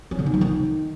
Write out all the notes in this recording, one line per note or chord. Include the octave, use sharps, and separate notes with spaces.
C#4
D3
D#4
F3
D#3